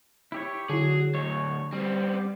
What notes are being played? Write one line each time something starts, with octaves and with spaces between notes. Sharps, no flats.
E4 G4 C#5
D3 F#3 E4 G#4
D2 F#3 C#5
G3 B3 C4